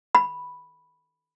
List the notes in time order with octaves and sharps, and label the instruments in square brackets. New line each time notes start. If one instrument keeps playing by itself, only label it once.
[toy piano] B5